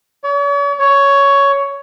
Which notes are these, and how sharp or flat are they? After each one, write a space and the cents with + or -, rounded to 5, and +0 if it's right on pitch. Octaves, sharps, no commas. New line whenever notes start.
C#5 +45
C#5 +10